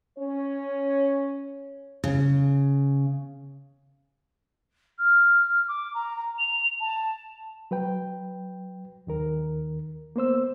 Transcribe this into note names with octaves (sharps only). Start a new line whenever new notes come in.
C#4 C#5
C#3
F6
D6
A#5
F7
A5
F#3 B4 G5
D#2 D#3 A#4
A#3 B3 C5 E6